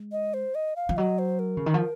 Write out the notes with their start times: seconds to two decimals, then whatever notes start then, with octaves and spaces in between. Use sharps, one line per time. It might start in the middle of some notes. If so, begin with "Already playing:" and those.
Already playing: G#3
0.12 D#5
0.34 C5
0.55 D#5
0.76 F5
0.89 F3
0.97 F#3 D#5
1.19 C5
1.39 A#4
1.57 C#3
1.66 D#3
1.74 F3